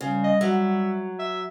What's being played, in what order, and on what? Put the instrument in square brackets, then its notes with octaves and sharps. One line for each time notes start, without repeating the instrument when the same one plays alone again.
[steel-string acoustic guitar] C#3 [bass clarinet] G3
[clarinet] D#5
[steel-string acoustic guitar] F#3 [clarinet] E5
[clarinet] E5